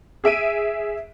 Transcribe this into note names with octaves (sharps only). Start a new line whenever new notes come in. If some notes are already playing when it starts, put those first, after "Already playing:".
G#4 E5 D7 D#7